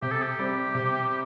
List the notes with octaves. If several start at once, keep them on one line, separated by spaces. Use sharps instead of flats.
C3 G4
A4
G4
G3 C4
C3